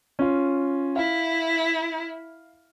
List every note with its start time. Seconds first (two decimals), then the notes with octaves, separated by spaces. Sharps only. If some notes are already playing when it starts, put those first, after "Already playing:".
0.19 C#4 F4
0.96 E4 F5